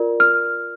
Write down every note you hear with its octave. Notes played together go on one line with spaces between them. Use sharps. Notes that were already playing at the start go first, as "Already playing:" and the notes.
Already playing: F4 A#4 D5
F6